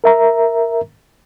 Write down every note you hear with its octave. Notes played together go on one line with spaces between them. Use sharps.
A#4 E5 A#5